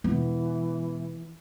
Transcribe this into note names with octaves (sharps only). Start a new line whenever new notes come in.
E1 E3 B3